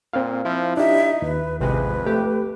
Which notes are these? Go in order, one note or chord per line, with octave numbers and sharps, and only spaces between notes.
A#2 C4 F5
F3 E4 F4
D4 D#4 G4 E5
D#2 B4
A1 F2 C3 G#3 B4
A3 G4